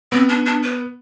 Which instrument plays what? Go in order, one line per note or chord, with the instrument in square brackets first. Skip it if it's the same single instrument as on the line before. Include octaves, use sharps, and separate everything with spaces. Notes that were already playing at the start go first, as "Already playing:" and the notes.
[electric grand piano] B3 [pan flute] C4
[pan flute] D4
D4
B4